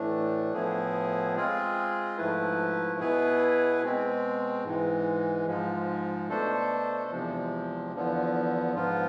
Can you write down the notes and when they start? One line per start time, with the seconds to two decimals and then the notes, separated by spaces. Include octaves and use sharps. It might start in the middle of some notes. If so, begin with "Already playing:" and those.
Already playing: A2 E3 A3 D4
0.53 A2 F3 B3 E4 G#4
1.36 G#3 C4 F4 G#4
2.18 G#2 F3 A3 E4 B4
2.99 B2 B3 E4 G#4 B4
3.82 B2 G#3 C4
4.65 G#2 E3 G#3
5.47 G#2 F3 G#3
6.29 B2 A3 D4 A4 C5
7.11 E2 C3 F3 G#3
7.93 E2 D3 F3 B3
8.75 G#2 F3 B3 F4